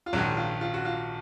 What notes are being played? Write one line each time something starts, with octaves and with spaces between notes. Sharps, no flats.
F4
A#1 G#2 D#3 F#3 F#4
F4
F4
F#4
F4